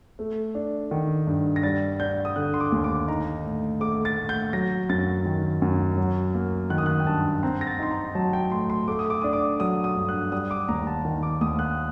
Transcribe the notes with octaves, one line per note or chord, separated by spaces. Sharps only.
A3
D4
D#3
G2
A#6
G3 A6
D4 G6
D#6
D3 F#6
C6
D6
D#2
D6
D#4 A#5
A2
A3 D6
A6
A2
G6
F#3 A#6
F#2 A6
D#3
F#2
F#3
A#3
D#3 F#6
D#6
F#6
G5
G2 A5
C4 A#5
A#6
A6
D#4 C6
A#5
F#3 A5
G5
A2 C6
C6
A3 D6
D#6
D6
D4 D#6
D6
F#3 D#6
D#6
G2
F#6
G3 D#6
D6
D#2 A#5
A5
D#3
D6
D#2 D#6
F#6